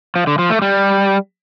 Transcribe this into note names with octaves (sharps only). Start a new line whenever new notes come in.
F3
D3
F3
A3
G3